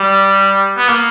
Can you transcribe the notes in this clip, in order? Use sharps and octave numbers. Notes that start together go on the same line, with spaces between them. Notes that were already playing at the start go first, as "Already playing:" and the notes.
Already playing: G3
B3
A#3